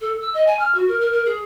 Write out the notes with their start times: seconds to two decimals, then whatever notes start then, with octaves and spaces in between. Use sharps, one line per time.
0.01 A4
0.21 E6
0.34 D#5
0.47 G#5
0.59 F6
0.75 F#4
0.88 A#4
1.01 A#4
1.12 A#4
1.26 G#4